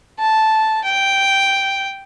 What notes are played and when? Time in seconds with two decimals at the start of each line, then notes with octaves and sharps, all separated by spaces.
0.19 A5
0.84 G5